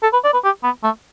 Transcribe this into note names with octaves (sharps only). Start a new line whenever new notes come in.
A4
B4
D5
B4
G4
B3
A3